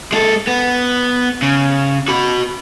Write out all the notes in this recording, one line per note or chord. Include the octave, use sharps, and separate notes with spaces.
G#3 A4
B3
C#3
F#4 B5